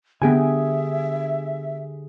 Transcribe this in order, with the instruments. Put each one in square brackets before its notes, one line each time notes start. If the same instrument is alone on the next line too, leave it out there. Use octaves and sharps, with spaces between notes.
[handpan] D3 G4 G#4 [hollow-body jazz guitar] B3 G5 G#5 [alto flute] E5